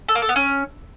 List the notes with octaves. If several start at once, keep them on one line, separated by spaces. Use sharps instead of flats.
A4
A#3
A4
B3
C#4